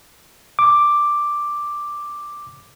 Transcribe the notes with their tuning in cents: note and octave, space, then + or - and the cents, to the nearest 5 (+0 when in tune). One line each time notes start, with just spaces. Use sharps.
D6 +5